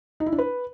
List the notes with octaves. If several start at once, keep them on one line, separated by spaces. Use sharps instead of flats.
D#4
E4
D4
B4